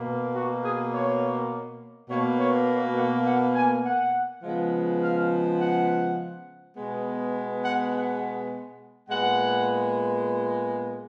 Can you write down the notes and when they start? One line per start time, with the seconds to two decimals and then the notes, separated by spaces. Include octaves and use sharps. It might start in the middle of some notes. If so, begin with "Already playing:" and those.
Already playing: B2 A#3
0.34 F#4
0.63 G#4
0.92 C#5
2.09 B2 A#3 C#5
2.38 C#5
2.97 F#5
3.25 F#5
3.55 G#5
3.84 F#5
4.43 C#3 F3 G#3 B3
5.01 F5
5.60 F#5
6.75 B2 G#3 B3
7.64 F#5
7.93 F#5
9.09 A#2 G#3 B3 F#5